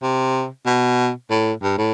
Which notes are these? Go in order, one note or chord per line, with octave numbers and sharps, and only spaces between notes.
C3
B2
A2
G2
A2